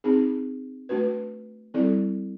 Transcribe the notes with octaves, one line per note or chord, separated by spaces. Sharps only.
C4 D#4 G#4
A3 D4 F#4 B4
G3 C4 E4 A4 D5